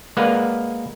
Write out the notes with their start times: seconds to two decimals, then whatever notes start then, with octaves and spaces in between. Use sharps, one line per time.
0.17 G#3 A#3 B4 D5 F5 F#5